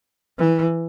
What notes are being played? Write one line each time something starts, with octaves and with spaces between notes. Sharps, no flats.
E3